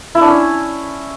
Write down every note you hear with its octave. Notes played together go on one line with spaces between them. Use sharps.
E4
D4
C#4